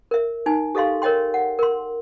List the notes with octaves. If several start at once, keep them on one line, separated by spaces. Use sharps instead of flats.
A#4 E5
D#4 G#5
G4 A4 D#5 F5 C6
A#4 C#5 D#5 G5 C6
F#5
A#4 C6